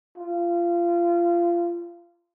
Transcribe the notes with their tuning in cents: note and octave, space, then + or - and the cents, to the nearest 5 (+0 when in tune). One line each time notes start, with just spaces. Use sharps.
F4 -25